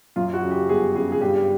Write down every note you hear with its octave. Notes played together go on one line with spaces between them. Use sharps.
F#2 F4
F#4
C#3
G4
G1 G#4
C#3 G#4
G#4
G2 G4